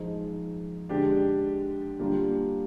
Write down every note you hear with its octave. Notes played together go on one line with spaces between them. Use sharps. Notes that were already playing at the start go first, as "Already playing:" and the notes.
Already playing: F3 G#3 D#4 G#4 C5
D3 G#3 D4 G4
D3 G3 A#3 D4 F4